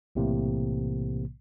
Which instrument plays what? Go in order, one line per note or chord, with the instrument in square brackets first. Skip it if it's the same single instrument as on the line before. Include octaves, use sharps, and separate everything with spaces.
[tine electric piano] B1 A2 C3 E3 A#3